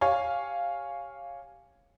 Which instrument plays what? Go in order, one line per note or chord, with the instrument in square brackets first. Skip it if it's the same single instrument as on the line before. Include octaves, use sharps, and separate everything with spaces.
[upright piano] G4 C#5 F5 G#5